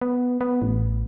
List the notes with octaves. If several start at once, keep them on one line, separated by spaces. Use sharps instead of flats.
B3
B3
A1